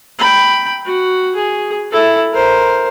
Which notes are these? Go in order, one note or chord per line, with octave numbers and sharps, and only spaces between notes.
G5 B5
F#4
G#4
E4 A4
A#4 C5